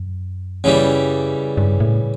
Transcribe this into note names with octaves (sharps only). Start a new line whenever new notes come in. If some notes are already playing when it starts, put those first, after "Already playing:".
Already playing: F#2
C#3 E3 G3
G2
A2